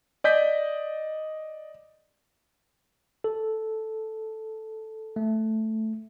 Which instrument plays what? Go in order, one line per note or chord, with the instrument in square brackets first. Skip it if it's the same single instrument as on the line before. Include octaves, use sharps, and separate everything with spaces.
[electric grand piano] D5 D#5 G6 B6
[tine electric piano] A4
A3